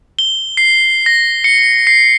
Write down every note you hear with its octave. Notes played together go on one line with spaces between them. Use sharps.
G7
C7
A#6
C#7
C7